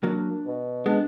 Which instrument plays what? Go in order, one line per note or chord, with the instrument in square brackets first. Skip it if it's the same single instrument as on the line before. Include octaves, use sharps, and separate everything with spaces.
[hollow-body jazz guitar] F#3 A#3 [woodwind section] D4
[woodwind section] B2
[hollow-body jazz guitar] G#3 B3 [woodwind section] D4